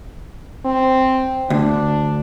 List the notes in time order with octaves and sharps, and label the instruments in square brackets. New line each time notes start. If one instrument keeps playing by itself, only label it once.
[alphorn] C4
[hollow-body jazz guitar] D2 [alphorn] D4